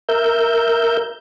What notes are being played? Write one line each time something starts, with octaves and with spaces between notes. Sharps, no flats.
A#4 E5 G6